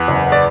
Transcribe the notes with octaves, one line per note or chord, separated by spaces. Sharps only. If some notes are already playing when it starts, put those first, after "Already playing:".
Already playing: E2 F#5
F#1
D5